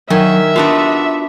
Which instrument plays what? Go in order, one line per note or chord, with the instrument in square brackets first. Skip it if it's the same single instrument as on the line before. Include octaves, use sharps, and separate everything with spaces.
[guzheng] D#3 G#5 [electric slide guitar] F#3 [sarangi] E5
[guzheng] B3 D4 D#5 [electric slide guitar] F4 F#4